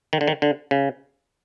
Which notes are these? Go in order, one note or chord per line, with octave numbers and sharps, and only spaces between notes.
D#3
D3
D#3
D3
C#3